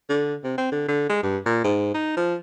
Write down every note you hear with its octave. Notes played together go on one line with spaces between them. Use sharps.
D3
C3
C4
D3
D3
G#3
G2
A#2
G#2
D#4
F3